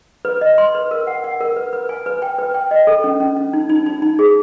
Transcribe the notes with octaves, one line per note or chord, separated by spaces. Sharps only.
B4
D#5
C6
B4
A#4
F#5
F#5
A#4
B4
B4
G#5
B4
G5
B4
G5
D#5
A4
C#4
C#4
C#4
D#4
D#4
D#4
D#4
G#4